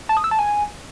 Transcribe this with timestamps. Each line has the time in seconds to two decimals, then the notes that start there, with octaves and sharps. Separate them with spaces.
0.09 A5
0.17 D#6
0.24 E6
0.31 A5
0.39 G#5